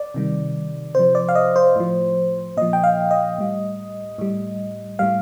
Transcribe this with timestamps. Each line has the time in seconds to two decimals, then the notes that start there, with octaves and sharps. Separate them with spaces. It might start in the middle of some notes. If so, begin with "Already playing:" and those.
Already playing: D5
0.14 C3 D#3 G3
0.95 C3 F3 C5
1.15 D5
1.29 F5
1.35 D#5
1.56 C5
1.76 A2 F3
2.57 A#2 F3 D#5
2.73 G5
2.84 F5
3.11 D#5
3.38 A2 G3
4.18 A2 G3
4.99 A2 G3 F5